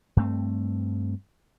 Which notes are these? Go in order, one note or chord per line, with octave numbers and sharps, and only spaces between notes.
G2 A3 C4